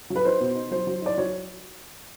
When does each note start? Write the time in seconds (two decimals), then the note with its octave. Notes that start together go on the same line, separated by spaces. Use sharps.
0.10 F#3
0.16 B4
0.25 D#4 C5
0.40 B2
0.55 D#4
0.71 F#3 C5
0.87 F#3
1.02 D#4 D5
1.18 F#3 C#5